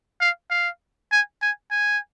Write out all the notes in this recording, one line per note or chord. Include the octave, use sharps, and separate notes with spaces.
F5
F5
G#5
G#5
G#5